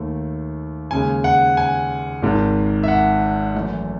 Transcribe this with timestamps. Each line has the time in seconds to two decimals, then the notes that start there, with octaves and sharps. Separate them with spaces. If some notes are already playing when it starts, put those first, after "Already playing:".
Already playing: D#2 D#3 A3
0.91 D#2 C#3 G#3 G#5
1.24 F#5
1.57 G#5
2.22 G#1 G#2 D#3
2.83 E5
2.88 F#5
3.54 F#2 E3 A3